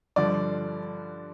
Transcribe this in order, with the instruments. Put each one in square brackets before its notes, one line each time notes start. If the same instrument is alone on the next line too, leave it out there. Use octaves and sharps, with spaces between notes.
[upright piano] G2 D3 F3 D5